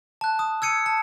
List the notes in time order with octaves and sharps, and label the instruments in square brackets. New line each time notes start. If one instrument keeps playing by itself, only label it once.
[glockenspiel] A5 F#6
D#6
E6 G#6 C#7 D#7
A5